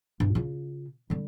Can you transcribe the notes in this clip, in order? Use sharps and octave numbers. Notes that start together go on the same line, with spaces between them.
G2
C#3 F4
D3 G3